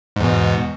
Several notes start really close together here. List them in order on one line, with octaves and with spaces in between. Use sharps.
G#2 E2 B2